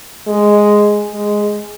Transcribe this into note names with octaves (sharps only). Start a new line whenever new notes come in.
G#3
G#3